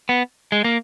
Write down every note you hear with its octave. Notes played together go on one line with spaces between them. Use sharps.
B3
G#3
A#3